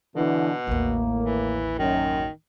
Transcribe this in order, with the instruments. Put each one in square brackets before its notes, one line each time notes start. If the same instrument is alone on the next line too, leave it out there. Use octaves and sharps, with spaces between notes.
[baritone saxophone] B2 [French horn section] D3 E3
[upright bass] A1 D#2 [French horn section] A2 A#3
[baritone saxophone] E3
[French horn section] F#2 [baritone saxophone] D#3